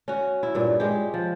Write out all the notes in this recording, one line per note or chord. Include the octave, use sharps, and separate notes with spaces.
C#4 F#4
E4
G2 A#2
G#3 G4
F3